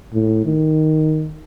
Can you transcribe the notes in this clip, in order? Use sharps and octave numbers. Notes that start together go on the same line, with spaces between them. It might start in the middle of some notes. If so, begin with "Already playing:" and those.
A2
D#3